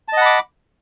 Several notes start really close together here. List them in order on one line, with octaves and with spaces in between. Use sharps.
A5 D#5 F#5 B5 D6